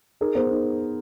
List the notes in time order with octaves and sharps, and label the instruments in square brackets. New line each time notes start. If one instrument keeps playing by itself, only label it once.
[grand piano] D#4 G#4 A#4
B3 A#4 C5
D#4